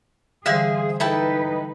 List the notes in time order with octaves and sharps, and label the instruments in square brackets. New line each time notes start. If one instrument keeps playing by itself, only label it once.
[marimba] D3 E3 G3 [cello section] G#4 C5 [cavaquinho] E5 F5 G#5
[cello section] D#4 B4 [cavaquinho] E4 A4 G5